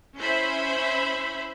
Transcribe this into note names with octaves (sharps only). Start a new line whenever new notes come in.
C#4 E4 C5 E5 B5